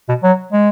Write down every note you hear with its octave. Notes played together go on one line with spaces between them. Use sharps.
B2
F#3
G#3